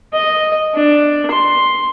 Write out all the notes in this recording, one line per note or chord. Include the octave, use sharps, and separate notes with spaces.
D#5
D4
C6